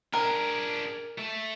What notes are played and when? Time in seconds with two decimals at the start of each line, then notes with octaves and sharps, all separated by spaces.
0.13 D4 G#4 A#4
1.18 A3 A4